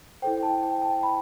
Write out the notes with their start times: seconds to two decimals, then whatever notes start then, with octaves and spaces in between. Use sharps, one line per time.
0.22 E4 A4 C5 G5
0.43 A5
0.63 G5
0.82 A5
1.03 B5